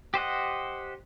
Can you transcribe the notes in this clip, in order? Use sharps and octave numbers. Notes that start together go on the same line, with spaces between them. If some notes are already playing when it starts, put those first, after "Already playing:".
G4 C5 D#5 F#5